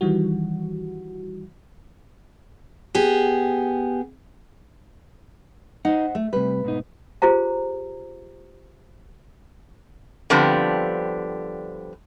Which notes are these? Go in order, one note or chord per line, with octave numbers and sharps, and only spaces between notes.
D#3 E3 G3 F#4
B3 G4 G#4
D#4 C5 D#5 F#5
A3
C3 G3 B4
G#2 B2 D#4
F4 G4 G#4 C5 A#5
D3 F3 G3 B3 C4